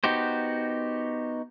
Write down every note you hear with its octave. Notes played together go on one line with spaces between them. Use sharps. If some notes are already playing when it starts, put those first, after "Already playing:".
B3 D#4 F#4 G4 C5